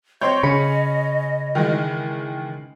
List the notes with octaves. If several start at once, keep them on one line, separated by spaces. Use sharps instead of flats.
C4 C#5 D#5 C6 G6
C#3 C#4 B5 C#7
D#3 E3 G#3